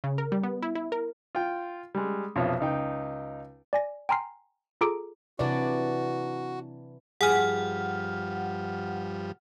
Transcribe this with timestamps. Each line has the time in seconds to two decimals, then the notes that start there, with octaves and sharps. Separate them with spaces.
0.04 C#3
0.18 A#4
0.32 G3
0.43 B3
0.63 E4
0.75 E4
0.92 A#4
1.35 F4 G5
1.95 G3 G#3
2.36 B1 F2 C3 F4 C#5
2.60 C#2 D#4 G5
3.73 D5 G#5 A#6
4.09 G5 G#5 A#5 C6 F6 C7
4.81 F4 G#4 A4 A#5 D6 D7
5.39 C3 E3 F#3 D4 F#4 D5
7.21 G2 F3 G3 G#4 F#5 G#5 F6